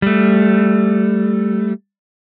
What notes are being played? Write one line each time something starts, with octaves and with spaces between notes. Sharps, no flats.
G3 A3